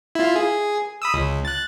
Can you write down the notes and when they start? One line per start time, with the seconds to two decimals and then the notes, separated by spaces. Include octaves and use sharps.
0.15 E4 F4
0.36 G#4
1.02 B5 D#6 E6
1.14 C#2
1.45 F#6 A6